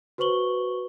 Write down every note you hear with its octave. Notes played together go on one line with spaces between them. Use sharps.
F#4 B4 C5 C#6 F#7 G7